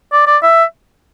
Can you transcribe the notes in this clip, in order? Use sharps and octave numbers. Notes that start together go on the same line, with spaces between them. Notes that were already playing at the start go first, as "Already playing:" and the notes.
D5
D5
E5